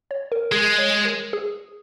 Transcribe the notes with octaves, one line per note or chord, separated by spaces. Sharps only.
C#5
A#4
G#3 G#4
C#5
A#4
G#4